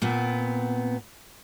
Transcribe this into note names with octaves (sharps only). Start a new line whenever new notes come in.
A#2 B3 C4